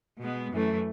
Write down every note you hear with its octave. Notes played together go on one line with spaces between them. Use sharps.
B2 G#3 B3
F#2 E3 A3